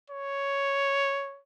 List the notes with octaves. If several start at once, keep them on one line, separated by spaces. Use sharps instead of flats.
C#5